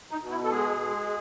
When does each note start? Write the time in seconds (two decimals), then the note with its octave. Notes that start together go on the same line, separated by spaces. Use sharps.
0.11 D#4
0.21 B2
0.31 E4
0.44 A4
0.50 G#3 G#4
0.80 G#3